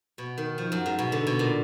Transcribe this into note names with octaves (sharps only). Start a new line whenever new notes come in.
B2
D#3
F3
F#2
G#2
B2
D3
B2
A#2